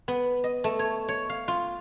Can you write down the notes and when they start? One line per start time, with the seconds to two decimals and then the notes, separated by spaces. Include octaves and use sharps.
0.08 B3
0.44 D#5
0.64 A3
0.79 C#5
1.09 C#5
1.30 F5
1.48 F4